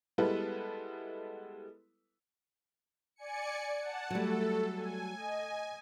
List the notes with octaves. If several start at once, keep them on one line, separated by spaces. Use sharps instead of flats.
G3 G#3 B3 E4 A4 B4
D5 G#5 C#7
F#5 A5
F#3 G3 A3 A4
G#5
D#5